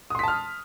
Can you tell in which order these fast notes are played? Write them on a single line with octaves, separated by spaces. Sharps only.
D#6 C6 B6 A5 F6